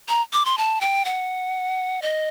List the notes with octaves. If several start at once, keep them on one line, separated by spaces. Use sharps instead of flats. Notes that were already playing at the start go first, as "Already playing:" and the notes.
A#5
D6
C6
A5
G5
F#5
D#5